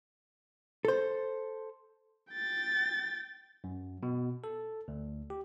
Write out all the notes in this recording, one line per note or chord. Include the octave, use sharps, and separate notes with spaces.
A4 C5
G5 A6
F#2
B2
A4
D2
G4